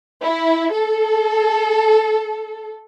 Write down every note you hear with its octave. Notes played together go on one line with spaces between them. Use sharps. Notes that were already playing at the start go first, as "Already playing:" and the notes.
E4
A4